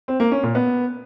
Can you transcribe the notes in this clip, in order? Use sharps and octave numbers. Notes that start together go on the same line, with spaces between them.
C4
A#3
C#4
A#2
B3